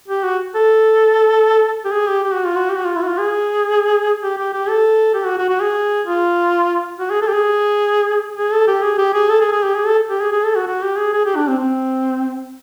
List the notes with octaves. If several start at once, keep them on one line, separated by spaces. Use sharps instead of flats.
G4
F#4
A4
G4
G#4
G4
G4
F#4
F4
F#4
G4
F#4
F4
E4
F#4
F4
G#4
G4
G4
G4
A4
G4
F#4
F#4
F#4
G#4
F4
F#4
G#4
A4
G4
G#4
G#4
A4
G4
G#4
G4
G#4
A4
G#4
G#4
G4
G#4
A4
G4
G#4
G#4
A4
F#4
F#4
G4
G#4
G#4
G4
D4
C4
C4